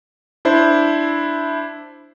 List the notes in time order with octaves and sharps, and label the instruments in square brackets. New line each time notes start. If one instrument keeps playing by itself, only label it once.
[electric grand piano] D4 E4 C5